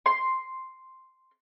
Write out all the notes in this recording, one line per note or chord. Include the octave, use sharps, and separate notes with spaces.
C6